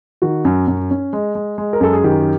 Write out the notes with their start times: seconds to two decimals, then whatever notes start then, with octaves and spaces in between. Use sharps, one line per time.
0.22 D#3 F#4
0.45 F#2
0.68 F#2
0.91 C#4
1.13 G#3
1.35 G#3
1.58 G#3
1.73 A#4
1.80 F#2 A4
1.93 G#4
2.04 D#3 G4